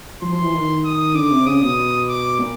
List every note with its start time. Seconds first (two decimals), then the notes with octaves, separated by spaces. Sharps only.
0.22 F3 C6
0.33 F3
0.42 E3
0.54 D#3
0.85 D#6
1.15 D3 D6
1.31 C3
1.46 C#3 D#6
1.62 B2
2.08 D6
2.39 A#2